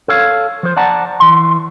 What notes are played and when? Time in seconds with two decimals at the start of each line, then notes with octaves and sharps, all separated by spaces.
0.08 A4 C#5 F5
0.63 F3 C5
0.77 D5 F#5 A5 A#5
1.20 E3 C6